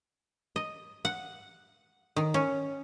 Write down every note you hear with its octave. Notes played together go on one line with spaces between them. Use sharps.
D#5
F#5
D#3
C#4